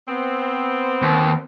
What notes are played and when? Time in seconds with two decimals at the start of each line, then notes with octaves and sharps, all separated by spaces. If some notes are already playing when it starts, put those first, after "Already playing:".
0.09 B3 C4
1.02 D#2